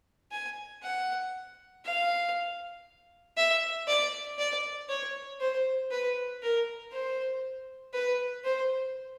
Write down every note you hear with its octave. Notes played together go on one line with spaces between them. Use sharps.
G#5
F#5
F5
E5
D5
D5
C#5
C5
B4
A#4
C5
B4
C5